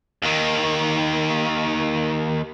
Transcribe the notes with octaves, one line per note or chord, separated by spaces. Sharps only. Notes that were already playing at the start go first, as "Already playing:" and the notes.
D#2 D#3